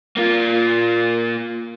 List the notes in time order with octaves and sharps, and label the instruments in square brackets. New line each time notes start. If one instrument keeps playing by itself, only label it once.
[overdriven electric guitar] A#3 F4